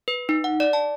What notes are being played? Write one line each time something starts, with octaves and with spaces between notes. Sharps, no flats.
B4
D#4
F#5
D5
A5